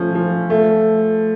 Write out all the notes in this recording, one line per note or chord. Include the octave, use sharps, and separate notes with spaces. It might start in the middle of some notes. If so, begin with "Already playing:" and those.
Already playing: F3 A3 C#4
F3
A3